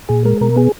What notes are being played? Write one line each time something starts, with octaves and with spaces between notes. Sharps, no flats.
A#2 G#4
G#3 A#4
B2 A#4
B3 G#4